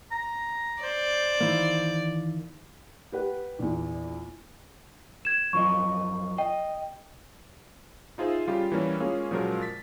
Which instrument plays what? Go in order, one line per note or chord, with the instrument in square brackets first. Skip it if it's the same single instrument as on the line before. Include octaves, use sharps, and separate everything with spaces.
[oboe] A#5
[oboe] C5 [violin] D5
[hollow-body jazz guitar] D#3 E3 A#3
[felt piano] G4 B4 F#5
A#1 E2
[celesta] G#6 E7
[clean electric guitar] F#2 F3 D#5 [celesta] C#6
[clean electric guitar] D#5 [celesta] G5
[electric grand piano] D#4 F4 G#4 C5 E5
C#3 G3 F4 G4
E3 G3 A#3 C#4
G#3 A#3 C#4 F4 G#4
A#2 C#3 F3 F#3 G#3 A#4
A6 B6